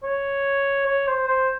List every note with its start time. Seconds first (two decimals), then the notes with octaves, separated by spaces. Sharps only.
0.03 C#5
0.85 C#5
1.07 C5
1.27 C5